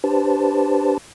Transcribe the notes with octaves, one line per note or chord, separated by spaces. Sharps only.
D4 G4 B4 C5 A5